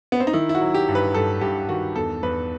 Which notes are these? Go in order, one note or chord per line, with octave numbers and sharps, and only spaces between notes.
B3
C4
D#4
D#3 E4
E4
F#4
F#3
G4
G2
B4
G2 A4
G2 G4
D#3 F#4
E2 A4
E2 B4